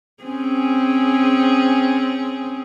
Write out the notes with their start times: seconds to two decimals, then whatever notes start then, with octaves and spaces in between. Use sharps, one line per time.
0.23 C4 C#4 G#4